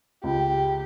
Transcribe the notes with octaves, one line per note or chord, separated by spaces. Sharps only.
C#2 G4